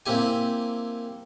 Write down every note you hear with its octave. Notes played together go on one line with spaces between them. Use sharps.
A#3 C4 E4 G4 G#5